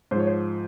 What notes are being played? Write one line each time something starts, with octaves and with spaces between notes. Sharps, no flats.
G#2 F3 C5 C#5
C5